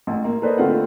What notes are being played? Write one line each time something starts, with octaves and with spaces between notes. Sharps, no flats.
A1
A#3
A#3 A4 B4 C5 D5 D#5
D3 A3 C4 F4 F#5